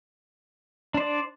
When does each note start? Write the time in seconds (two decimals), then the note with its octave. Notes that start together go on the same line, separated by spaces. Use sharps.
0.94 D4
0.97 C5
1.00 D5